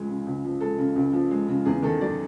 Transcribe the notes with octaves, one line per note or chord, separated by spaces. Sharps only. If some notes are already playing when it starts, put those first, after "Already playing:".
Already playing: C#2 F3 G#3
C#3
C#2
F3
G#3 A4
C#3
C#2
F3
G#3
C#3
E2 G#4
D#3 A4
F#3 D5